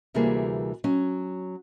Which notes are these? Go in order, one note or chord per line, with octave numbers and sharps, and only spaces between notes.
D2 C3 E3 G3 A#3 G#4
F#3 C#4